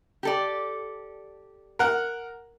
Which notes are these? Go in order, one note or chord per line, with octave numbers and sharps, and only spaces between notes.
G4 A4 D5
A#4 F#5